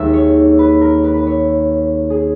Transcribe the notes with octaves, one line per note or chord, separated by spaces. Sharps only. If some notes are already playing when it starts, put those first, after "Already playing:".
Already playing: D#2 D#3 G#3 E5
C#5
B4
A#4
B4
B4
C#5
G#4